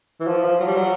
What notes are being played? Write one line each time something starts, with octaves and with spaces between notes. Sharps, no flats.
E3
F3
F3
F#3
G3
F#3